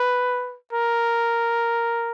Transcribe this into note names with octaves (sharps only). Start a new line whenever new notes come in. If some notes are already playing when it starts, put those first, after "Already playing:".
Already playing: B4
A#4